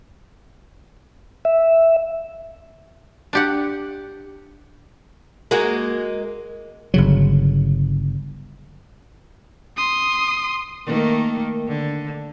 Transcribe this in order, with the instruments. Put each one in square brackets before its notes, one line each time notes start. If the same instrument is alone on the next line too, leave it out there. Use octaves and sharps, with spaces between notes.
[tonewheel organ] E5
[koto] D4 G4 F#5
[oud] G#3 A#3 F#4
[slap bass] G1 C#3 F#3
[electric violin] C6 D#6
[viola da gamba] D#3 A3 A#3
D3